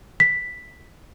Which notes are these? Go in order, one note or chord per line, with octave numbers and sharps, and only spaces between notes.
B6